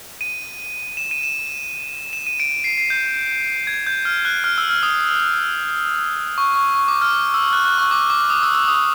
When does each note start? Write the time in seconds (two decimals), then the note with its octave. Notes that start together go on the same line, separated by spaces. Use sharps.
0.21 D#7
0.97 E7
1.11 D#7
1.23 E7
2.13 E7
2.27 D#7
2.40 D7
2.64 C7
2.78 C7
2.90 G6
3.67 G#6
3.87 G6
4.05 F6
4.25 F#6
4.44 F6
4.58 E6
4.70 F6
4.83 D#6
6.38 C#6
6.56 C#6
6.75 C#6
6.88 D6
7.02 F6
7.34 E6
7.53 F#6
7.65 F#6
7.78 C#6
7.91 D6
8.10 D6
8.30 D#6
8.43 E6
8.55 E6
8.68 D#6